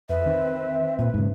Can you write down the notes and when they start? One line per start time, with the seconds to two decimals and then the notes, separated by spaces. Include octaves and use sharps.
0.09 F2 B4 E5
0.26 D#3 C4
0.99 A#2 B4
1.14 G#2 C#3